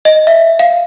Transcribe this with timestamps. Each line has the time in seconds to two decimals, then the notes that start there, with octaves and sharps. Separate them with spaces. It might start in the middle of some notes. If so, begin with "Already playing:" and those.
0.05 D#5
0.27 E5
0.59 F5